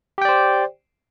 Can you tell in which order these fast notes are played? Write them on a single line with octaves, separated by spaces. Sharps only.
G4 G5 D5 C5